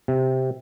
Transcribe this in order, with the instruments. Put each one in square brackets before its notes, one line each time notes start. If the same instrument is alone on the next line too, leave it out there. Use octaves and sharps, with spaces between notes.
[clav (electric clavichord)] C3